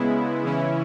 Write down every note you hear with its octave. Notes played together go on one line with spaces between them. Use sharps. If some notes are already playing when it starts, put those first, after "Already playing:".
Already playing: C#3 G#3 B3 E4
C#3 E3 C#4 E4